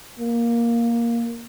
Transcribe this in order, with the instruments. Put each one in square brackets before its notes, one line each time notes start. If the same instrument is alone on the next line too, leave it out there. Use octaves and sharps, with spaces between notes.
[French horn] A#3